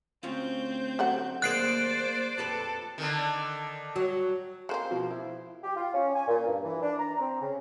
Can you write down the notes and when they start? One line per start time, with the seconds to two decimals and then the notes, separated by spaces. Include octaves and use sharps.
0.23 D2 C4 C#4 F4 G6
0.99 F#3 A3 F#5
1.42 D#2 A#3 G#4 C5 D5 F#6 C7 D7
2.38 F2 G4 A4 B4
2.98 D3 D#3
3.96 F#3
4.69 G#3 A#3 C4 C5
4.91 B2 F3
5.10 E4
5.64 G4
5.76 F4
5.94 C#4
6.15 G#5
6.27 A#2
6.46 G2
6.65 E3
6.82 D4
6.99 A#5
7.20 C4
7.41 C#3